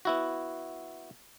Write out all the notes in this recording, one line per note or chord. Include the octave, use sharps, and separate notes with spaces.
B3 E4 F#4